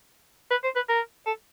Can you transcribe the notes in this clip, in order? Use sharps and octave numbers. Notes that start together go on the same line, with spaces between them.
B4
C5
B4
A#4
A4